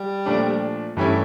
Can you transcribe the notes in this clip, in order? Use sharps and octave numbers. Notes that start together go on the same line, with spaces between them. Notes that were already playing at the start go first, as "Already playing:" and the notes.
Already playing: G3
A#2 F3 A3 D4
G2 E3 G3 A3 C#4 E4